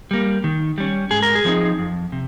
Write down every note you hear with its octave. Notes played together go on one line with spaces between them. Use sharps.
G3 A#3
D#3
G3 C#4
G#2 G#4
A#4
G#4
F3 C4 D#4
F2
C3